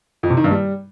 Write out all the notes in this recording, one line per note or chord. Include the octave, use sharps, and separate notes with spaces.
F2
C3
D#3
G2
G3